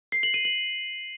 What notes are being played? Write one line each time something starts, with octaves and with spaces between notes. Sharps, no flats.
C7
F#7
D#7
F#7